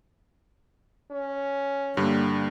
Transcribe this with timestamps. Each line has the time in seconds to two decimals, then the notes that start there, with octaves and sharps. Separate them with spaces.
1.12 C#4
1.97 G2 D3 G3 A#3